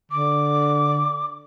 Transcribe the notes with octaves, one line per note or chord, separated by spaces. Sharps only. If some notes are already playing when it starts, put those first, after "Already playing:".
D3 D6